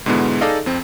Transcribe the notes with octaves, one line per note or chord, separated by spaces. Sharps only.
G#2 B2 D3 G#3 B3 E4
D#4 G#4 A4 D5 D#5 F5
F2 C4